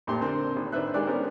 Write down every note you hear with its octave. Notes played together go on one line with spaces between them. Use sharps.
F2 A#2 A3 C4 G4 C6
D3 A#3 C4
G#1
D#3 D4 B4 C5 E5 F#6
D#3 G#3 G4 D5 F#6
B3 C#4 G4 A#4 C5